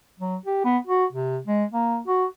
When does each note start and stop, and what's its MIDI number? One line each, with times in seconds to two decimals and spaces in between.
0.19 0.36 54
0.46 0.64 67
0.65 0.78 59
0.87 1.05 66
1.12 1.39 48
1.47 1.64 56
1.72 1.99 58
2.08 2.25 66